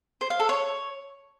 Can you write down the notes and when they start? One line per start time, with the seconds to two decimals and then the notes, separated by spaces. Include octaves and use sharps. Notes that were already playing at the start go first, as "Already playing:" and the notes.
0.21 C5
0.30 F5
0.40 A4
0.49 C#5